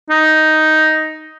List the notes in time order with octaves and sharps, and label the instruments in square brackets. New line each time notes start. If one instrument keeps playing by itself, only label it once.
[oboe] D#4